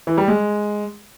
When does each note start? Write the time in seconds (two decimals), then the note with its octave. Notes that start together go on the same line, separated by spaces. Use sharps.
0.07 E3
0.18 G3
0.28 G#3